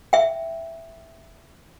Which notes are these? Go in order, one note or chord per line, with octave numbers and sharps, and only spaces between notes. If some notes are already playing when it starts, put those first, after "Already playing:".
E5 G5